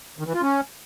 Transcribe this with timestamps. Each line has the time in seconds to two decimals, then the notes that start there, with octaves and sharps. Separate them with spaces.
0.19 D#3
0.26 E3
0.34 F4
0.42 C#4